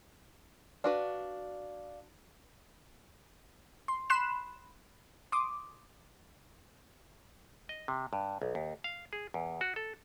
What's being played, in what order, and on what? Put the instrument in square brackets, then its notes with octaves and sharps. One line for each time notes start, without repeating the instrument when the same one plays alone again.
[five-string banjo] D4 F#4 B4 [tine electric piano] D5 F5 D6
[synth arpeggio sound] C6
B5 C6 F#6 C7 E7
C6 D6 D#6
[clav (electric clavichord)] D#5
C3
G2
B1
D#2
F5
G#4
E2
F#4
A4